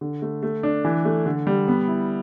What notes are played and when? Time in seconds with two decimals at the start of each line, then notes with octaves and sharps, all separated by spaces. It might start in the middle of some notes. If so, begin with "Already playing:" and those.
0.01 D3
0.22 A3
0.43 A3
0.63 D4
0.85 E3
1.05 A3
1.26 D3
1.47 G3
1.68 B3
1.88 E4